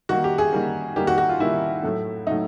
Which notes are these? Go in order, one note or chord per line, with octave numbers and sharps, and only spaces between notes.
D#3 G3 A#3 F#4
G4
G#4
D#3 G3 A#3
D#3 G3 A#3 G4
F#4
F#4
F4
D#3 G3 A#3 E4
A2 F#3 A3
A2 F#3 A3 D#4